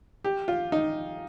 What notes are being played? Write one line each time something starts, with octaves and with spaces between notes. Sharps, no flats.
G4
F4
D#4